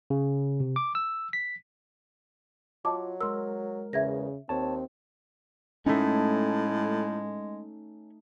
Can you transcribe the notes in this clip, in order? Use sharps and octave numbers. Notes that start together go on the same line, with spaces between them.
C#3
C3
D6
E6
B6
F#3 F4 D#5 A5 D6
G#3 A#4 C6 E6
E2 C#3 E5 G#6 A#6
D#2 C4 C#5 A5
A2 G#3 A3 C#4 D#4